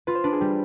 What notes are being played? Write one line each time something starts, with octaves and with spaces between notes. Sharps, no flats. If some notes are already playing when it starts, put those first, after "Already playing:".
F4 B4
C5
D4 B4
G#4
G3 G4